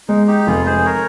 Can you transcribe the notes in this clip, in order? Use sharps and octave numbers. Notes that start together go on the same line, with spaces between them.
G#3 D#4
D#4 G4
F1 F4 G#4
G#4 C5
A#4 C#5